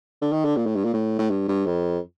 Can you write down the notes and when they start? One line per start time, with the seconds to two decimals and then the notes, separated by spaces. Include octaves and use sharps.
0.22 D3
0.32 D#3
0.45 D3
0.57 A#2
0.66 A2
0.75 G2
0.85 A#2
0.94 A2
1.19 A2
1.30 G2
1.48 G2
1.66 F2